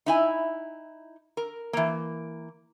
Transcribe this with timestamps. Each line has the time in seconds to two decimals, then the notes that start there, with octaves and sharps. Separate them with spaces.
0.06 D#4 E4 G#5
1.37 A#4
1.73 E3 A#3